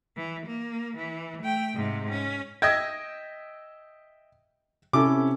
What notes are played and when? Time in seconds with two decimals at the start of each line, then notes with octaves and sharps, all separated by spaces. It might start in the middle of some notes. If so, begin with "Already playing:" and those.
0.16 E3
0.46 A#3
0.96 E3
1.42 A3 G5
1.75 G#2 C3
2.11 C#4
2.62 D#5 E5 G5 G#6 A#6
4.93 C3 C#4 E4 A4 D6